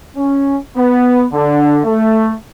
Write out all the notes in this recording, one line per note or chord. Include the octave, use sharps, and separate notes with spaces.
C#4
B3
D3
A3